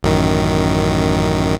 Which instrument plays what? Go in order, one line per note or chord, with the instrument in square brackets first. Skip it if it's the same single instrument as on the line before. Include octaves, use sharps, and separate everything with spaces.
[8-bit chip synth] A1 F#2 D#3